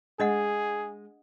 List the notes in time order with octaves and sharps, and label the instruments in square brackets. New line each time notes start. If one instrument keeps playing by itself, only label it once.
[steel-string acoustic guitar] G#3 [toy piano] D4 D#5 F#5 [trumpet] G#4